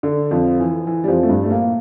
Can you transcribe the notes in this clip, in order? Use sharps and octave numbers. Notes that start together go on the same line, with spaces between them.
D3
F2 F3
E3
E3
G3
F2 F3
A3
G2 G3
A3
A#2 A#3